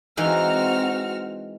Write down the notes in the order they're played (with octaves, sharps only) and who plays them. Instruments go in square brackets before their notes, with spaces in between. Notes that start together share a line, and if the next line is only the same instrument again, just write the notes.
[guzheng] E3 G#3 D#4 [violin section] C4 F#4 F6